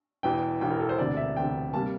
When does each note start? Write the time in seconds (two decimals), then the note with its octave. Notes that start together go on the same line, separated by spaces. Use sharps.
0.23 E1 E2 E3 G5
0.61 E1 E2 E3 G5
0.70 A#4
0.80 A4
0.89 C5
0.98 E1 D2 C3 D5
1.17 E5
1.36 E1 D2 C3 G5
1.73 C3 G3 A#3 A5